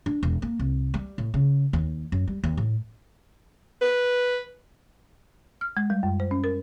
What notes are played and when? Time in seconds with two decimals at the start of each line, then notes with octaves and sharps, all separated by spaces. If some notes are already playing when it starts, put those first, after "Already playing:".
0.06 D4
0.23 E1
0.42 A#3
0.59 C2
0.94 G3
1.18 A2
1.34 C#3
1.73 D#2
2.12 F#2
2.28 G3
2.44 D#2
2.57 A2
3.82 B4
5.61 F6
5.77 G#3
5.90 G3
6.03 F#2
6.20 C5
6.31 C#4
6.44 A#4